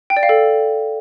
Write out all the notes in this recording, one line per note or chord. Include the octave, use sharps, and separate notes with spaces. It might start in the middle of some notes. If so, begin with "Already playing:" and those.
G5
D5
F5
A4